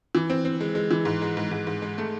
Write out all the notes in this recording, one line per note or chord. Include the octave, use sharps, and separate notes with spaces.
E3
C4
C4
G#3
G#3
E3
G#2
G#3
G#2
G#2
G#2
G#3
A3